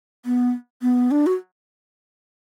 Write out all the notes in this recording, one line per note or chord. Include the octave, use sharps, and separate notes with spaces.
B3
B3
D4
F#4